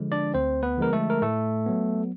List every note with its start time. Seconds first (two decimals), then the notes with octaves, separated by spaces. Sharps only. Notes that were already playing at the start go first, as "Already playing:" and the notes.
Already playing: D3 F3 G#3
0.12 D4 D5
0.34 D2 C4 C5
0.63 B3 B4
0.78 D3 F3 G#3 A#4
0.93 A3 A4
1.10 A#4
1.22 A2 A3 A4
1.66 F#3 B3